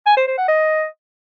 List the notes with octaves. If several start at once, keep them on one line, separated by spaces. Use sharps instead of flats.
G#5
C5
C5
F#5
D#5